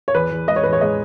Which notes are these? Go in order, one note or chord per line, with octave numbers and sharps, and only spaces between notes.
C#5
E2 B4
E2
G#3 D#5
C#5
E2 B4
C#5
G#3 D#5